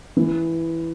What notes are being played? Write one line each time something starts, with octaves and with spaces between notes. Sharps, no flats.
E3